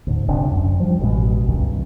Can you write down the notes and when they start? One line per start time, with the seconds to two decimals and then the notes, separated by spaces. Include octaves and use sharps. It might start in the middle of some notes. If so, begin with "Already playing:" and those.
0.07 D2 G#2
0.28 G1 D2 C3 D4
0.51 F#2
0.80 F3 G3
1.00 A1 B2 D3 G#3
1.48 C#2 G2 D#3